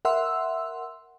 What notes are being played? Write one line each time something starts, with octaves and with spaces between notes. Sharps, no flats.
A#4 E5 F#5 C6 E6